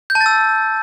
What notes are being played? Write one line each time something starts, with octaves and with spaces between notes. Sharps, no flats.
G6
A5
A6
E6